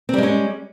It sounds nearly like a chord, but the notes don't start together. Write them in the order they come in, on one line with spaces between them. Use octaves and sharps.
C4 G3 G#3 C#4